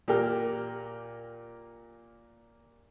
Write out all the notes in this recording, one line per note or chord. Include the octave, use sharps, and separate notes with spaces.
A#2 G4 A#4 G5 F6